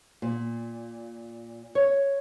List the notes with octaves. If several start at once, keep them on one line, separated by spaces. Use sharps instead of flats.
A#2
C#5